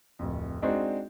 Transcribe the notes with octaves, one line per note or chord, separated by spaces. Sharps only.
D1 F2
G#3 C4 D4 D#4 F#4 C5